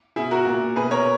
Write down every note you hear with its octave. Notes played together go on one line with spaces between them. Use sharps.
B2 E4 G#4
F#4 A#4
A#2
B2 G#4 B4
A#4 C#5